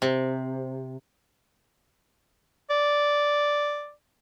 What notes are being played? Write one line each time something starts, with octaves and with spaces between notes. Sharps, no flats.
C3
D5